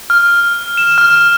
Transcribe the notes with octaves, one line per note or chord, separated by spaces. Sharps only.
F6
E7
F6